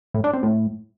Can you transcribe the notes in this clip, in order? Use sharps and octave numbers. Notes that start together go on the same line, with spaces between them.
A2
D4
C4
A2